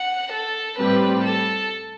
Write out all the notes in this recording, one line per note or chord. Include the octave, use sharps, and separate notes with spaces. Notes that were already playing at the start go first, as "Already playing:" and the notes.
Already playing: F#5
A4
A2 G3 C4 G4 B4
A4